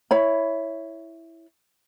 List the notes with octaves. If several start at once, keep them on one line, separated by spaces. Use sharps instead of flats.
E4 C#5 B5